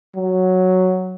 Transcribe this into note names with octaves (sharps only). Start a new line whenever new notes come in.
F#3